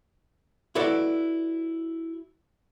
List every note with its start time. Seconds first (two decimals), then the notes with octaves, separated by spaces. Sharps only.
0.75 E4 F#4 A4 B4 D5